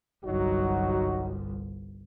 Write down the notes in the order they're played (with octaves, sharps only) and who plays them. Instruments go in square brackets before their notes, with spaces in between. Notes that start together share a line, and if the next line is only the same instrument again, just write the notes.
[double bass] G1 C2 [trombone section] F#3 D#4 F#4